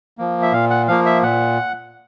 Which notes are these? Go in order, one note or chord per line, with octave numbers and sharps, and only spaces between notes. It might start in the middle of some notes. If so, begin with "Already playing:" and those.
F3 A#3
E5
A#2 F5
F#5
F3 A#3 F5
E5
A#2 F#5